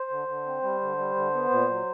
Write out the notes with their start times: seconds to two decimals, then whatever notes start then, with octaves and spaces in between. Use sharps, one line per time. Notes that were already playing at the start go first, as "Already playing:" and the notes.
Already playing: C5
0.10 D3
0.28 D3
0.46 C4
0.63 G3
0.81 D3
0.98 G3
1.15 D3
1.34 B3
1.50 A#2
1.69 F#3